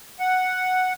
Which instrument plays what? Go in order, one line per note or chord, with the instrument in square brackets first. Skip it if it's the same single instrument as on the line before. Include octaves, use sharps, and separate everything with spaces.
[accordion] F#5